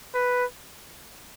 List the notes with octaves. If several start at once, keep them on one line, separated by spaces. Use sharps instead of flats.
B4